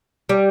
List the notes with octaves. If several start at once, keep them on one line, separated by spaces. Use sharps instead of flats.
G3